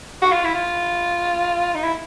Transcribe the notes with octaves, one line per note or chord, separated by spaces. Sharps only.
F#4
F4
E4
F4
D#4
E4